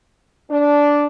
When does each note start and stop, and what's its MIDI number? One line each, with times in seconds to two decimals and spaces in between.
0.50 1.05 62